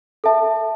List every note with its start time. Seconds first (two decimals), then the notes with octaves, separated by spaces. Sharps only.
0.24 A4 E5 A5